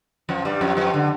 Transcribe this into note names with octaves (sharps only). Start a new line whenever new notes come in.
F2 F3
G2 G3
F2 F3
F2 F3
D3